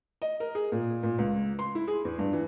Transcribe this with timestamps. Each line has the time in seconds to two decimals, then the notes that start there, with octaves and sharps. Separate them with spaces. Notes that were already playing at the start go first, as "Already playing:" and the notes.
0.22 D#5
0.40 A#4
0.55 G#4
0.72 A#2
1.03 A#2
1.18 C#2
1.59 C6
1.75 E4
1.88 G#4
2.05 E2
2.19 G2
2.33 E3